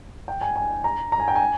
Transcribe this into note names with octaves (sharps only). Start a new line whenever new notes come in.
G5
G#5
G#5
A#5
A#5
G#5
G5
G#5